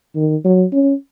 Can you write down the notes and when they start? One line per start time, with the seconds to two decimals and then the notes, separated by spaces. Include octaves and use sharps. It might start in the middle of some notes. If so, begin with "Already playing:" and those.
0.16 D#3
0.44 F#3
0.73 C#4